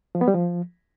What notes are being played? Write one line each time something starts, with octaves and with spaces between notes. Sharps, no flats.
F3
B3
G3
F3